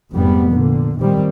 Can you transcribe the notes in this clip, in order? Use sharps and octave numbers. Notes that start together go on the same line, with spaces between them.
F1 G#2 G3 B3
A#2 D3
A#2 D#3 G3 C4